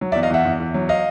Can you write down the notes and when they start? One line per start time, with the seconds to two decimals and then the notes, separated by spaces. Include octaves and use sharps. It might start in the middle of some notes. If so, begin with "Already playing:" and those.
0.01 F#3
0.12 D5 E5
0.15 E2
0.23 D#5 F5
0.30 E2 E5 F#5
0.45 E2
0.60 E2
0.74 F#3
0.89 D#5 F5